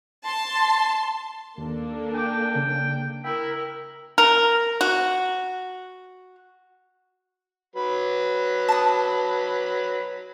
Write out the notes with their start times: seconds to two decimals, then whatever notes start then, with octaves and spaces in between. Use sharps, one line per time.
0.25 A5 C6
1.58 D#2 A#3 D4 A4
2.15 G5 G#5 D6
2.55 C#3
3.24 E4 A#4 G5
4.18 A#4
4.81 F#4
7.76 F#3 B4
8.68 A5 D#6